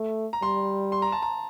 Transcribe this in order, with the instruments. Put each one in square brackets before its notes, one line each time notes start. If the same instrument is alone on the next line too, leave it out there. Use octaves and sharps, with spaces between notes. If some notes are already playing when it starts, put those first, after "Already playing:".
Already playing: [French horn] A3
[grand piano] A#5
[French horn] G3 [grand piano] C6
[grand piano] C6
A#5
A5
A#5